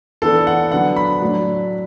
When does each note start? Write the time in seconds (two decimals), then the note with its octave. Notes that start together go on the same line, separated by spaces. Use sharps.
0.22 E3 B3 D4 A4
0.47 F#5
0.72 D3 F#3 B3 D4 F#5
0.96 B5
1.21 A2 F#3 D4